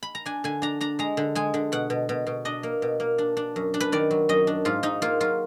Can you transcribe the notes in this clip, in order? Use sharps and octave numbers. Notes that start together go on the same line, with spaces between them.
B5
A#5
D4 G#5
D3 G#5
D4 A#5
D4 A#5
G#3 A#5
D3
G#3 G#5
D3
B2 F#5
B2
B2
B2
D4 D#5
A#3
B2
A#3
D4
D4
F#2
D4
B4
D#3 D5
F#3
F#2 D#5
D4
G#2 F4
G#2 D#4
A#3 F4
F#3 F4